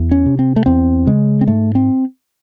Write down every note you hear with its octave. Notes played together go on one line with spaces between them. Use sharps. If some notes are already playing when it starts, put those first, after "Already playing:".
Already playing: E2
C#4
C3
C4
A3
E2 C4
C#3 G#3
C4
G#2 A3
C4